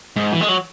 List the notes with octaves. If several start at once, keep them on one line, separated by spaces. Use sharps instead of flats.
G#2
E3
G#3
F#3